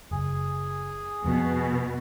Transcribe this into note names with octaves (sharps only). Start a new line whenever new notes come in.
F#1 G#4
F2 B2